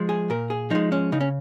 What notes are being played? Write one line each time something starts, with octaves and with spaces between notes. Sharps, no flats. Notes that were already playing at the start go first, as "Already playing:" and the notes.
Already playing: F3 G#3
G#4
A#2 A#4
G#4
F3 G#3 D#4
C#4
C#3 D#4
C#4